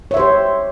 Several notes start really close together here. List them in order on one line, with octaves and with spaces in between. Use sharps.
C#5 E5 C5 G4